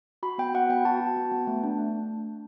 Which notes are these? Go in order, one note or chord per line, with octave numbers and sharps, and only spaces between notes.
F#4 B5
B3 G5
F#4 F#5
B3 G5
F#4 A5
F#4
B3
B3
A3
D4
A3